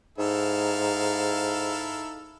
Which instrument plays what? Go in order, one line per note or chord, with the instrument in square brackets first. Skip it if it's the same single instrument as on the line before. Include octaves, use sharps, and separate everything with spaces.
[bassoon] G#2 [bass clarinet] D#4 [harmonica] E4 A4 F5